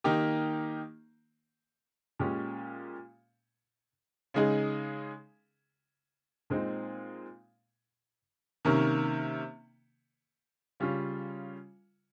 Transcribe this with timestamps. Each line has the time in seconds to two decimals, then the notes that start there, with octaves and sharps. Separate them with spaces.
0.04 D#3 A#3 D#4 G4
2.20 A#2 G#3 C#4 G4
4.34 C#3 G#3 D#4 G#4
6.50 A#2 G#3 C4 D#4
8.65 C3 D#3 A#3 C#4
10.80 C#3 G3 C#4 F4